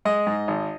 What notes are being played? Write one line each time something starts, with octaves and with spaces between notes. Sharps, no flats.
G#3 D#5
G#2
G#1